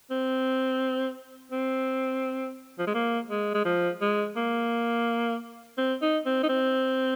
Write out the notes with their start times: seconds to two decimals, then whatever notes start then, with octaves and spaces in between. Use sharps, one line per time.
0.10 C4
1.52 C4
2.79 F3
2.87 G#3
2.95 A#3
3.30 G#3
3.54 G#3
3.65 F3
4.01 G#3
4.36 A#3
5.78 C4
6.02 D#4
6.26 C4
6.43 D#4
6.49 C4